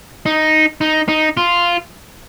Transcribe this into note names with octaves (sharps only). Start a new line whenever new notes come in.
D#4
D#4
D#4
F4